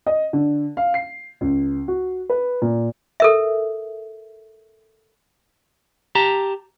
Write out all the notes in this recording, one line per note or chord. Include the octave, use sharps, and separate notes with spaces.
D#5
D3
F5
C7
C#2
F#4
B4
A#2
A4 A#4 E5
G4 A5 A#5